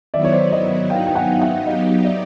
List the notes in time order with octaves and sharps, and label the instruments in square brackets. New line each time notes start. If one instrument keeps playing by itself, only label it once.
[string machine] D#3 F#3 B3 E4 [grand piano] D5 E5
[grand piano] C#5
C5 D5
C#5 D#5
[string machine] F#3 B3 D#4 [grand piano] F5 G5
[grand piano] G5
F#5 G#5
F5
E5 F#5
[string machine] F#3 B3 D#4 G4 [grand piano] D#5 F5
[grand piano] D5 E5